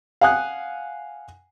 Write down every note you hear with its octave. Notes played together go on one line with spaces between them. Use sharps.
F5 F#5 G#5 D#6 F#6